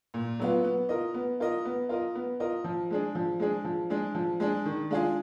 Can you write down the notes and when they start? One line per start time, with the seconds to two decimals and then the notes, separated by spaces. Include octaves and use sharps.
0.14 A#2
0.40 F#3 B3 F4
0.64 B3
0.89 F4 A#4 D#5
1.14 B3
1.40 F4 A#4 D#5
1.65 B3
1.89 F4 A#4 D#5
2.15 B3
2.40 F4 A#4 D#5
2.64 F3
2.91 G#3 D4 G#4
3.15 F3
3.40 G#3 D4 G#4
3.64 F3
3.90 G#3 D4 G#4
4.15 F3
4.40 G#3 D4 G#4
4.65 D#3
4.91 G#3 D4 F4 G#4